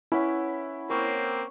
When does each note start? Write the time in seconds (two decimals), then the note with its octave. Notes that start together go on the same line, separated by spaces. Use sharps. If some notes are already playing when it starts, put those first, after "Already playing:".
0.12 C#4 E4 B4 F#5
0.90 A#3 C4 C#5